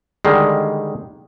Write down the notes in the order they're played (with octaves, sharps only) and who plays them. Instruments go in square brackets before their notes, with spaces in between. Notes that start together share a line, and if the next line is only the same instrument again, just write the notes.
[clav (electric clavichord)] D3 D#3 G3 G#3